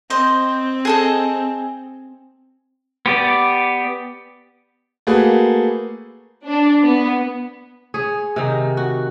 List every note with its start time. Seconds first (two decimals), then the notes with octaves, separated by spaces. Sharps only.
0.10 C4 C5 D#5
0.85 G#4 A4 D#5
3.06 B3 G4 D5
5.07 A3 A#3 F#4 G#4 B4
6.46 D4
6.83 B3
7.94 G#4 C#5
8.36 C3 D#3 D#4
8.77 F#4